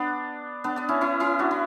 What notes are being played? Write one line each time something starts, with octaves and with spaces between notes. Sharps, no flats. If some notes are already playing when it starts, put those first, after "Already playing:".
Already playing: B3 D4
B3 D4
B3 D4
C#4 E4
C#4 E4
C#4 E4
D4 F#4
E4